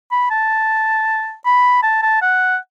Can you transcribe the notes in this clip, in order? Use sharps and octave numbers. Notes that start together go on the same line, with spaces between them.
B5
A5
B5
A5
A5
F#5